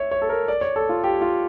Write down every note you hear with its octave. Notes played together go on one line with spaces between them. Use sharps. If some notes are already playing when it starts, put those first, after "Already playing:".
Already playing: C#5 E5
C#5
A4
A#4
D5
C#5
A4
F4
G4
F4